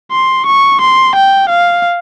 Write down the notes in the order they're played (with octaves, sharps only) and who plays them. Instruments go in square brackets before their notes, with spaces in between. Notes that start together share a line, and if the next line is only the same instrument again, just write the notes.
[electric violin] C6
C#6
C6
G5
F5